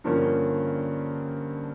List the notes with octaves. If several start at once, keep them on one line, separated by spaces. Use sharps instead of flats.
G2 D3 F3 A#3 C#4